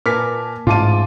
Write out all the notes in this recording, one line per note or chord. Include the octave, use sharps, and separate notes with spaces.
A#2 A#4 B4 G#5 A5 D6 F6 B6
A1 G#2 F4 E5 A5 D6 D#7